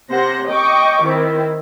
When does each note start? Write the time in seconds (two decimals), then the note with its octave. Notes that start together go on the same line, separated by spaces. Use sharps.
0.12 C3 C5 F#5 A#6
0.51 D#5 G5 C#6 D6
1.04 D#3 C4 E4